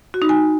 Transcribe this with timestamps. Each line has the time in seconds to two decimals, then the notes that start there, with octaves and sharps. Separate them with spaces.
0.14 F#4
0.22 D#4
0.29 G#5